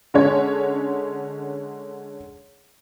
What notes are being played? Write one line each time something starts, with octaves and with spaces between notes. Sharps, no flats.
D3 G#3 C#4 C#5